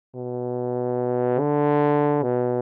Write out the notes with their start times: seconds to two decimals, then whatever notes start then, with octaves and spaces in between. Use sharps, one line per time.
0.16 B2
1.40 D3
2.23 B2